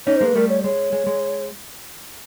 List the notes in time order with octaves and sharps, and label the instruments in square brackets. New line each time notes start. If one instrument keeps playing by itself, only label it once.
[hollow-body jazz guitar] C#4 D#4 [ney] C#5
[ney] C5
[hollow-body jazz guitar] G#3 A#3
[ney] B4
[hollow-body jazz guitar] G3 A3 [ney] A#4
[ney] C#5
[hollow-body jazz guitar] G#3 [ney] C#5
[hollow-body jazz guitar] G#3
G#3